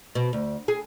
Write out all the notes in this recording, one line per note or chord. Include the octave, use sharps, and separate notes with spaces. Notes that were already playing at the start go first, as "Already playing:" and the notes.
B2
D2
G#4